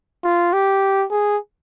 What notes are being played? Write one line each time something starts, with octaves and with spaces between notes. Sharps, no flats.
F4
G4
G#4